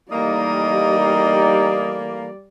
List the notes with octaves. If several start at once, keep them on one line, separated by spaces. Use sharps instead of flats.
E3 G3 A3 A#3 D#4 G4 D5 D#5